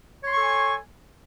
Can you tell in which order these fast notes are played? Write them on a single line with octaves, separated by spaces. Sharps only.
C#5 C6 C#6 A4 G#5